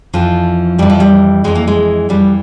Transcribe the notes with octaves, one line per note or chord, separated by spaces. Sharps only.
F2 E3 F3
F2 E3 G3
F3
G3
F2 E3 G#3
A#3
G#3
F2 E3 G3